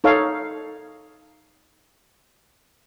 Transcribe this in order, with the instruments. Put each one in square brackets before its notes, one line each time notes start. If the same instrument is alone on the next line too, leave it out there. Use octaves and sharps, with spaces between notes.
[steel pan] D#4 A4 C#5 F5